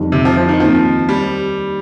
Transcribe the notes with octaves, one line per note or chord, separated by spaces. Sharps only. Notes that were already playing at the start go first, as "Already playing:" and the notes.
Already playing: F2 D#3 G3
C3
F3
F3
D#3
D#2 D#3 F3 C4 D#4
G3